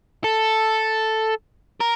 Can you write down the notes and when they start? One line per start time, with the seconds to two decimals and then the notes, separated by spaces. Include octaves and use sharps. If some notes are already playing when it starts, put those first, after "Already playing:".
0.24 A4
1.80 A#4